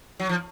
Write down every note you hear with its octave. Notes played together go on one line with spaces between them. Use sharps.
F#3
F3